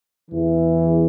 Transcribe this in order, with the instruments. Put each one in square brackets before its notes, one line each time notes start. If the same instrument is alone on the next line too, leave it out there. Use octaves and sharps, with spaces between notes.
[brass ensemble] E2 E3